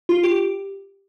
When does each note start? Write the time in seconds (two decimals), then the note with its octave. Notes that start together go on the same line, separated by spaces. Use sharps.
0.09 F4
0.23 G4